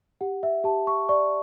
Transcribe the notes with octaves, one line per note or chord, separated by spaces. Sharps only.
G4 F#5
E5
G4 A5
C#6
D5 C#6